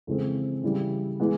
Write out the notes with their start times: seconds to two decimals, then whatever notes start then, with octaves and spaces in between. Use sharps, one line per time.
0.07 F2 C#3 E3 G#3 C4
0.63 C#3 E3 G3
1.20 E3 G#3 B3